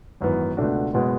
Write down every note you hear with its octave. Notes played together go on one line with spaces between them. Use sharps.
G#1 F#2 E3 B3
C#2 B2 A3 D4 F#4
F#1 B2 G#3 B3